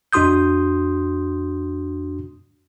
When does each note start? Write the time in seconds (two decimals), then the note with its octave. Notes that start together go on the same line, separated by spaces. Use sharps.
0.13 F2 D4 F#4 C6 D#6 G6